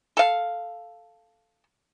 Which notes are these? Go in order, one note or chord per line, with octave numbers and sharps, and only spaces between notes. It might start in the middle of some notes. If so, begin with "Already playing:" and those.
A4 F5